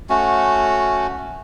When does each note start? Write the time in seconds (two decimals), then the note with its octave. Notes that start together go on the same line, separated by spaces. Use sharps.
0.10 A3 C#4 F#4